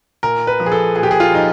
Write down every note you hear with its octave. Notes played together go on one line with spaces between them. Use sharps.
A#2 A#4
B4
F3
G#4
A4
A#2 G#4
G4
G#4
F4
F3 D#4